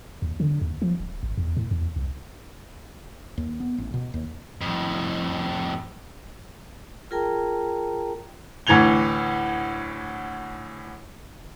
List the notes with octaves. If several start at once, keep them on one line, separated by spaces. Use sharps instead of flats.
D#2
D3
D#2
F3
D1
G#1
E2
A2
E2
C2
D#2
B3
A1
B2
D#2
F2 A2
F4 G#4 A#4 G5 A5 A#5
D2 A2 E3 G#6 F7 G7